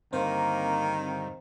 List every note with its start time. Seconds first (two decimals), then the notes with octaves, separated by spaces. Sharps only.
0.13 G2 D3 D#3 A#3 C4 C5 F5